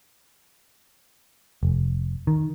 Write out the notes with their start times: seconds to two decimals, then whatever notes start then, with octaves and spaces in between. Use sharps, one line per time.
1.63 F1
2.27 D#3